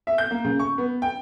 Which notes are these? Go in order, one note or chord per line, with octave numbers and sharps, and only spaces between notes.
E5
G6
A#3
C#3
C#6
B3
G5